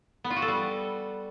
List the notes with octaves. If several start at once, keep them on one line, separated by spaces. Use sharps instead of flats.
B3
F4
F#4
A4
G3